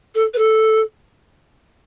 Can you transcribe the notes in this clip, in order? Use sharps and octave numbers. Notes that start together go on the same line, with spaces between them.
A4
B4
A4